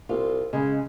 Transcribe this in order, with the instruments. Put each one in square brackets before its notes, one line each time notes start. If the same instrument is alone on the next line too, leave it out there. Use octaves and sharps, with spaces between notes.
[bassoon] C2 [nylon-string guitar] F4
[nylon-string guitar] C#3 [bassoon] G#3